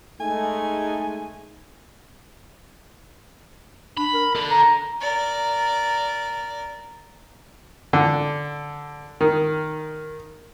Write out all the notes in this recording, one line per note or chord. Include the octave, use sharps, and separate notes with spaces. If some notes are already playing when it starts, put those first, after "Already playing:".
G#3 A3 D#4 G#5
D4 B5
A#4
D4 A4
A#5
A#4 D5
D3
D#3